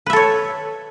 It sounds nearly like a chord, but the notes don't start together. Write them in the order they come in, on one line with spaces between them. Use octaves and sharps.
B4 E5 A4 C#5